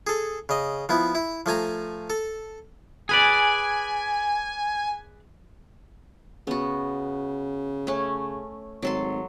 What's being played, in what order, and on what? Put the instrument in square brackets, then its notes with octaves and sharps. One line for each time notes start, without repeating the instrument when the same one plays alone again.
[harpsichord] G#4 A4
C#3 D#5
F3 B3 E4
E4
F3 A3 G#5 A#5
A4
[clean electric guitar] G#4 B4 D5 [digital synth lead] G#5
[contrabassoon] C#3 [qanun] B3 F#4
[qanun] A3 C#4
[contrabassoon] G#1 [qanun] F#3 A4 C6